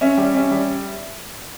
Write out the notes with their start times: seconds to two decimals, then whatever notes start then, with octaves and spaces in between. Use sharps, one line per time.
0.01 C#4 E5
0.17 G3
0.34 C#4
0.51 G3